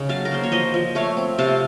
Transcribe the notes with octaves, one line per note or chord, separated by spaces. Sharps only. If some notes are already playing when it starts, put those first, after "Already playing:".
Already playing: C#3 D#4 C#6
F#3 F5 A5
A#4
A#3 C5
C#5
F3 C5 D#5
F3
A3 C#5 F5
C4
C3 F5 A5